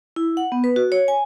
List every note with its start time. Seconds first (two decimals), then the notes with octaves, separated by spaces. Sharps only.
0.16 E4
0.37 F#5
0.52 B3
0.64 B4
0.76 F#4
0.92 C#5
1.08 G#5